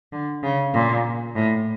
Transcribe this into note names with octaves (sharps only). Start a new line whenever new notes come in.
D3
C#3
A#2
A2